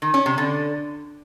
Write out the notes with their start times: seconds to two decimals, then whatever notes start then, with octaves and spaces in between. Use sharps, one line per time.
0.02 D#3
0.14 C#4
0.26 C3
0.38 D3